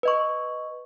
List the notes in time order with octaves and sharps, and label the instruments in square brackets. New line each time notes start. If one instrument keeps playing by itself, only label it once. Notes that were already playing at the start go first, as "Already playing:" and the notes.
[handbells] B4 D#5 C#6